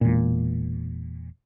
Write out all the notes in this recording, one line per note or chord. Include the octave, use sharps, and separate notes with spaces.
E1 A#2